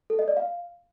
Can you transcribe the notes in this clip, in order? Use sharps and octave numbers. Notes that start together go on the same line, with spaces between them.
A4
D#5
D5
F5